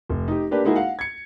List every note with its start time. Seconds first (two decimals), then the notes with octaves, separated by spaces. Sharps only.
0.10 F1
0.28 D#4 G4
0.51 A#3 D4 G4 B4 D5
0.64 G#3 A#3 D#4 E4 F#4 G#4
0.76 F5 F#5
0.99 G#6 C#7